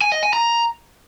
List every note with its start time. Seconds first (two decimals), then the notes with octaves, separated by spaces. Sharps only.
0.01 G#5
0.12 D#5
0.23 G#5
0.33 A#5